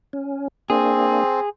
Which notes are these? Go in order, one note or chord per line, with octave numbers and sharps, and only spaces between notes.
C#4
A#3 C4 D4 G#4